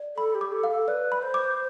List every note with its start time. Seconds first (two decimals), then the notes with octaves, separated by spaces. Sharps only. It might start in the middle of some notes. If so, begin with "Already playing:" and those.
Already playing: D5
0.17 A4 B5
0.35 G4
0.41 D6
0.52 A4
0.64 F5
0.70 A4
0.88 B4 D5
1.12 B5
1.23 C5
1.34 D6